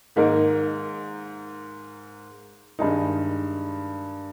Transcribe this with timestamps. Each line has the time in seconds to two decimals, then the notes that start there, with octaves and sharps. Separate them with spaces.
0.16 G#2 D#3 A#3 D#4 A#4
2.79 G2 D#3 G#3 D#4